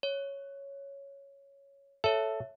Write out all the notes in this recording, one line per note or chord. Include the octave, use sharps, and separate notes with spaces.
C#5
A4 C#5 E5